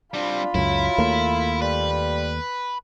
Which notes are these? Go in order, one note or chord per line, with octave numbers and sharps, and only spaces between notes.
G3 C4 D4 F4 B5
C#2 F#2 F#3 E4
D#2 A3 A#3
G3 B4